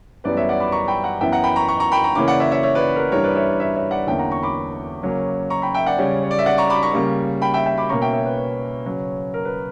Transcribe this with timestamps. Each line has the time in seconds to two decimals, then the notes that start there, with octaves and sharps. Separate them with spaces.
0.24 F#2 E3 G3 B3 B4 D5
0.37 C#5 E5
0.49 D5 F#5
0.60 B5 D6
0.72 A#5 C#6
0.88 G5 B5
1.04 F#5 A#5
1.21 F#2 E3 B3 E5 G5
1.32 F#5 A#5
1.44 G5 B5
1.56 A#5 C#6
1.68 A#5 C#6
1.80 A#5 C#6
1.92 G5 B5
2.04 A#5 C#6
2.15 C#3 E3 A#3 C#4 B5 D6
2.28 D5 F#5
2.40 C#5 E5
2.51 C#5 E5
2.63 C#5 E5
2.75 B4 D5
2.96 A#4
2.99 B4
3.11 G2 E3 G3 A#4 C#5
3.24 B4 D5
3.35 C#5 E5
3.60 C#5 E5
3.75 C#5 E5
3.91 D5 F#5
4.07 E2 D3 A#3 C#4 E5 G5
4.19 F#5 A#5
4.31 A#5 C#6
4.42 B5 D6
5.03 C#3 F#3 A#3 C#4
5.50 A#5 C#6
5.62 G5 B5
5.74 E5 G5
5.86 D5 F#5
5.98 C#3 G3 C#4
6.23 C#5
6.31 D5
6.39 E5
6.46 D5 F#5
6.58 A#5 C#6
6.70 B5 D6
6.83 A#5 C#6
6.94 C#3 G3 A#3
7.42 G5 B5
7.54 E5 G5
7.66 E5 G5
7.78 B5 D6
7.89 B2 A#3 C#4 A#5 C#6
8.01 E5 G5
8.13 C#5 E5
8.26 B4
8.37 B4
8.85 C#3 F#3 C#4
9.34 A#4
9.45 B4